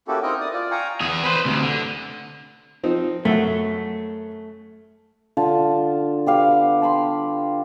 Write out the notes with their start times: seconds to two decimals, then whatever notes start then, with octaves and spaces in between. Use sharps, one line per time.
0.08 A#3 C#4 E4 F#4 G4 A4
0.23 C4 D#4 E4 A#4 D#5 G5
0.40 D5 D#6
0.53 F4 D5
0.71 F5 G5 G#5 A#5 C#6
1.01 E2 G#4
1.24 B4 C5
1.45 D2 C3
1.62 D3
2.83 F3 C4 D#4
3.25 F#2 A3 E5 F#5
5.37 D3 F4 F5 A5
6.26 B3 G4 F5
6.82 A5 B5 C6